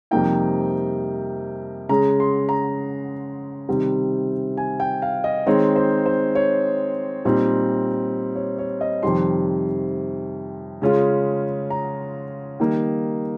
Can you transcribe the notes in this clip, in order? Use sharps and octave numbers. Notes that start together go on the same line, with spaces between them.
F2 C3 G3 A#3 D#4 G5
C#3 G#3 C#4 A#5
C6
A#5
C3 D#3 G3 C4
G#5
G5
F5
D#5
D#3 G#3 C4 D#4 C#5
C5
C5
C#5
A#2 G3 C4 D#4
C#5
C#5
D#5
F2 C3 D#3 G3 C6
C#3 G#3 C#4 F4
A#5
D#3 G3 A#3 D#4